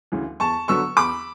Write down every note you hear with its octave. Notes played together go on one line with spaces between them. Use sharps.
D2 C#3 E3
E2 A5 C#6
D3 F#3 B3 C#6 E6
E2 B5 D6